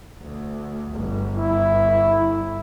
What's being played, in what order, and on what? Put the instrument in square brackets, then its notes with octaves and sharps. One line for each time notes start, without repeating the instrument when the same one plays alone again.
[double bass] D2
G1
[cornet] E4